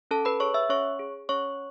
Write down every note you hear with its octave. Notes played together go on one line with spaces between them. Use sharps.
C#4 A4 A5
B4 B5
G#4 C#5 C#6
E5 E6
C#4 C#5 C#6
G#4
C#4 C#5 C#6